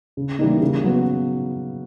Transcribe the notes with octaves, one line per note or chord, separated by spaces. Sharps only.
C#3
E3 G3 A#3 D#4
C#3
F#3 B3